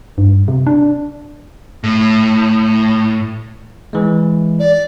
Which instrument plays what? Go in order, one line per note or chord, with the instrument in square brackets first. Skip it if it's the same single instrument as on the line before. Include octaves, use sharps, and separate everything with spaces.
[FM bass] G2
C3
D4
[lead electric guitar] A2
[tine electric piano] E3 G#3
[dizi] D5